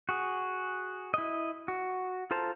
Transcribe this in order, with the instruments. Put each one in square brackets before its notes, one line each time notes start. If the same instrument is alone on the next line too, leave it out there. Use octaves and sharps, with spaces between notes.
[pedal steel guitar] F#4 G#4
E4 D#5
F#4
F4 A4 C5 A5 A#5